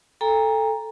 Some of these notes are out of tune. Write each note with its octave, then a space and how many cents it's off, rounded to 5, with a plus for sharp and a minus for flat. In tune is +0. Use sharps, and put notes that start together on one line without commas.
A4 +0 G5 +45 A#5 +0